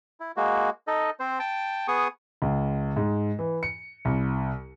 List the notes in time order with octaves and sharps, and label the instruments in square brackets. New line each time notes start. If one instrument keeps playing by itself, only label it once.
[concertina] E4
G#3 A#3 F#4
D#4 A4 D#5
C4 C5
G5 A5
B3 G#4 C#6 D#6
[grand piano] C#2
G#2
E3
C#7
C2